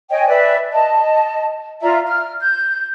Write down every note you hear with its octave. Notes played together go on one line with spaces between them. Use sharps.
C#5 D#5 G5 G#5
B4 D5 E5
D#5 A5
F4 D5 E5 A#5
F6
G6